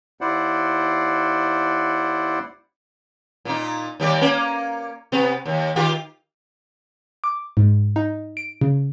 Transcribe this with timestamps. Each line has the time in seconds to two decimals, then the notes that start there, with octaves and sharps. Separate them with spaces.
0.21 D#2 E4 C5 D5 F#5
3.45 A#2 D#4
4.00 D#2 G3 D5
4.21 A#3 C#4
5.12 C3 B3
5.46 D#2
5.76 D#3 F4 G4
7.24 D6
7.57 G#2
7.96 D#4
8.37 D7
8.61 C#3